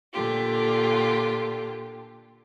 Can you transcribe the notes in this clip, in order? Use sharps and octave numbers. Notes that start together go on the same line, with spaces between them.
A#2 D3 F4 G4